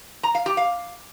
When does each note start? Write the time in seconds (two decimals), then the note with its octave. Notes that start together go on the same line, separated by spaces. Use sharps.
0.23 A#5
0.35 F5
0.46 G4
0.57 F5